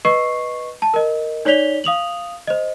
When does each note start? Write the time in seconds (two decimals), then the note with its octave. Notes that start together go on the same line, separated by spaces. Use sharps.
0.05 B4 D#5 C#6 C7
0.82 A5
0.94 A#4 D#5
1.45 D#4 C#5 D5 B6 F7 G7
1.84 F5 D#6 F7 F#7
2.47 C5 D#5